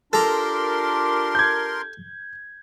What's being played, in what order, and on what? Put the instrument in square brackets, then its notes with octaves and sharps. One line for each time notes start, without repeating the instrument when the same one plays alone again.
[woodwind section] D4 F4 G4 [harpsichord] A4 A#5 [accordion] A#4 C6
[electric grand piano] G6 G#6